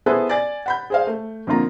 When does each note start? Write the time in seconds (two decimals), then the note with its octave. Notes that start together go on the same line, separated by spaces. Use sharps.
0.06 B3 E4 G#4 A4 B4 C5
0.29 D5 G#5 A6
0.66 F#5 B5 G6
0.90 G#4 C5 F5
1.07 A3
1.47 F2 D3 A#3 F4 A#5